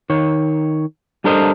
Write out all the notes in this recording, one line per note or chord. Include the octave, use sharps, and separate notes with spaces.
D#3 C#5
G3 D4 A4 A#4 C5 D#5